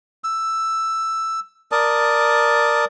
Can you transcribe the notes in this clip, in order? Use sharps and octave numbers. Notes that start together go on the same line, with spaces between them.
E6
A#4 D5 A5 D#6